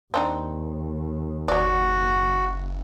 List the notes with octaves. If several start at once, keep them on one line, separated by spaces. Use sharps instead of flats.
D#2 C4 D4 D#4
F#1 F#3 F#4 D5